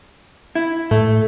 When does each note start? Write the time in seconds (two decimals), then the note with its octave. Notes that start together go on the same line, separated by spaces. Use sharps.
0.55 E4
0.91 A2 A3